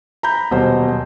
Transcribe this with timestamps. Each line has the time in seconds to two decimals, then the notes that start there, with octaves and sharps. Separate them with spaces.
0.23 A#5 B5 G6
0.51 D#1 B2 F#3 C5